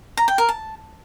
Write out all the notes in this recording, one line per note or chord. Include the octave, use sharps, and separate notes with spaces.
A#5
G5
A#4
A5